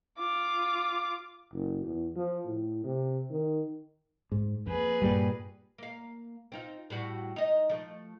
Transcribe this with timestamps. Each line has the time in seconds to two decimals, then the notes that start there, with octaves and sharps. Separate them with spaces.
0.18 F4 D6
1.53 F#1
1.85 E2
2.16 F3
2.46 A2
2.84 C3
3.31 D#3
4.32 G#2
4.67 F2 A#3 G#4 B4
5.02 G2 A#2 G3
5.78 A#3 F5
6.52 C4 D#4 F4
6.90 A2 G3 F#4
7.36 D#4 D#5
7.70 F3 A3